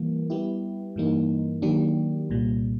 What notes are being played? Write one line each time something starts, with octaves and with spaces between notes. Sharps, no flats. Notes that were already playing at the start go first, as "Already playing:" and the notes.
Already playing: E3 G3 A#3
G3 B3 E4 G4
G2 E3 G3 A#3 D#4
D#3 F#3 A#3 D4 G4
C2 A#2 G3